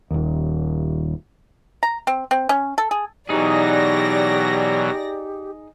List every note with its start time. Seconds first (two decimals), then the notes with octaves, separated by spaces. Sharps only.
0.11 D#1 D#2
1.83 A#5
2.07 C4
2.31 C4
2.49 C#4
2.78 A4
2.91 G#4
3.29 B2 E3 F#3 D#4 G4 G#4 D5 A#6